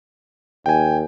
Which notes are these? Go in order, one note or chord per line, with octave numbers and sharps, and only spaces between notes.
D#2 G5 G#5